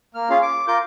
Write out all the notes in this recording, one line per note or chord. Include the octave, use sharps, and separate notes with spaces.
A#3 F6
C#4 F4 G#4 F5
D6
F4 A#4 D6 G6